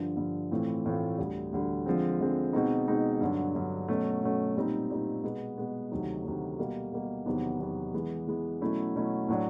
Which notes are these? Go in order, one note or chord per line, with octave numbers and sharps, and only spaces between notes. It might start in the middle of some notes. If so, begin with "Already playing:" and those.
Already playing: G2 D3 F3
G2 D3 F3
A2 E3 A3 C4 F4
A2 E3 A3 C4 F4
D2 D3 G3
D2 D3 G3
D3 F3 G#3 C4
D3 F3 G#3 C4
B2 G#3 C4 D#4
B2 G#3 C4 D#4
G2 D3 F#3
G2 D3 F#3
B2 F#3 A3 C#4
B2 F#3 A3 C#4
A#2 G3 C4 D#4
A#2 G3 C4 D#4
B2 G#3 B3
B2 G#3 B3
D2 C3 D#3 F#3
D2 C3 D#3 F#3
B2 G3 A#3
B2 G3 A#3
E2 C3 D#3 F#3 B3
E2 C3 D#3 F#3 B3
E3 G#3 B3
E3 G#3 B3
B2 F#3 A3 C#4 E4
B2 F#3 A3 C#4 E4
A2 F#3 A3 D4